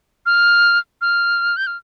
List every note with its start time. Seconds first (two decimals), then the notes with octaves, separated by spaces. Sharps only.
0.26 F6
1.01 F6
1.57 G6
1.67 F6